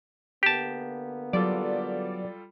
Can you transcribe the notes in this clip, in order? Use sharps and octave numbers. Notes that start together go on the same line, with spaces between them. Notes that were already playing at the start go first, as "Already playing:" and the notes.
D3 A#3 B3 G4 A5
F#3 G3 F4 A4 D5